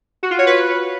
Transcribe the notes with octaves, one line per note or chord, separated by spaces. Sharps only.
F#4
F4
C#5
B4